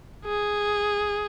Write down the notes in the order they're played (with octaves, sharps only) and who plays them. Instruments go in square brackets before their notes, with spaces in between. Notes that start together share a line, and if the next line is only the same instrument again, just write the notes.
[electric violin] G#4